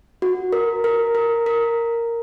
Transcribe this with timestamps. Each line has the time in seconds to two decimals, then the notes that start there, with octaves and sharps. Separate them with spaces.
0.22 F#4
0.53 A#4
0.84 A#4
1.15 A#4
1.46 A#4